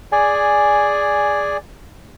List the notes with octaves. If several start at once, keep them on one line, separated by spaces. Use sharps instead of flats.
G#4 D5 G#5